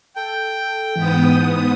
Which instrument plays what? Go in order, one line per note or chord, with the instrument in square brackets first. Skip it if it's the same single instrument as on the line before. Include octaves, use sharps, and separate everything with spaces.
[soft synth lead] A4 [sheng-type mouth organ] G5
[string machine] G#2 B3 D#6 [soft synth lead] E3